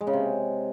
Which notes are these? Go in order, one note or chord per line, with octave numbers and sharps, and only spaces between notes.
G#3
C#3
C3